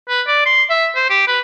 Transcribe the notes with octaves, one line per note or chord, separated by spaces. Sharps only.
B4
D5
C6
E5
C5
G4
B4